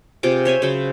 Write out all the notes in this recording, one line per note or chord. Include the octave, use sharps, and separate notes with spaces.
C3 F4 G#4 D6
C5 C#5 E5 G#5
C#3 F#3 C5 B5